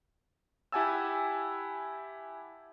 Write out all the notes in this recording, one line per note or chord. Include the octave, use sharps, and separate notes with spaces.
E4 G4 F#5 G#5 A5 E6